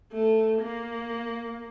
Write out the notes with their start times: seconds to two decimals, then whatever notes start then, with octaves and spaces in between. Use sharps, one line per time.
0.13 A3
0.62 A#3